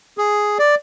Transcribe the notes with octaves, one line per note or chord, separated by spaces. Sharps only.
G#4
D5